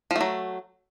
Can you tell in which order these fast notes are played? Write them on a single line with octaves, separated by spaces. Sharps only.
F3 A3 F#3